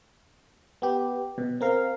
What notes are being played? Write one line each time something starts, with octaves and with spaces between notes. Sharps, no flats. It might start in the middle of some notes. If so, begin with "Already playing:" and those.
B3 G4
B2
C4 A#4 F5